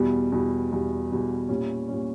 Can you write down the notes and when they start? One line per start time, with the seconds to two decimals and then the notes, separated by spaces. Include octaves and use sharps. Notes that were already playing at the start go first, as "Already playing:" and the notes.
Already playing: E2 B2 G3
0.32 E2 B2 G3
0.71 E2 B2 G3
1.10 E2 B2 G3
1.49 A#2 G3 C#4
1.89 A#2 G3 C#4